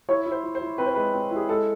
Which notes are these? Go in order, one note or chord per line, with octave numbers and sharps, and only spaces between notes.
E4 C#5
E4
C5
E4
C5
E4
C4 B4
C5
G#3 B4
C4
E4
G#4
G#3 A4